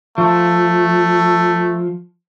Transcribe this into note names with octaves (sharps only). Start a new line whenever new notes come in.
F3 A3